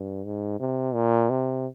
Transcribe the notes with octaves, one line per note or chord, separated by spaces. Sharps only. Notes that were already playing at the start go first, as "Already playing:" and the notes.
Already playing: G2
G#2
C3
A#2
C3